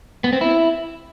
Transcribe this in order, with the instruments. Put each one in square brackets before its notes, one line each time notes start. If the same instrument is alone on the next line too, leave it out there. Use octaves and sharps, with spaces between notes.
[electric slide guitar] B3
C4
E4